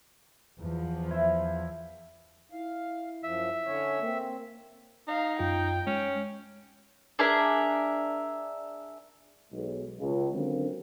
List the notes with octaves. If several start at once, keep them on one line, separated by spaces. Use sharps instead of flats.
E2 F3
E4 C5
E4 F5
F#2 F3 E5
D3 C#4 C#5
A#3 C4
D#4 F5
F#2 F4 G5
G#3 C#4
D4 G#4 A#4 E5
B1 G#3
C#2
D3 D#3 F#3 A#3 C4 C#4